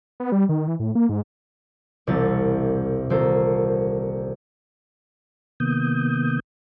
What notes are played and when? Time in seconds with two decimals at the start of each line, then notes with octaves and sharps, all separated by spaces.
0.20 B3
0.32 G3
0.49 D#3
0.68 E3
0.80 A2
0.95 A#3
1.09 G#2
2.07 E1 C2 G3 E4 A6
3.10 D#1 C2 A#3 A4 C5
5.60 C3 D#3 A#3 B3 D#6 G6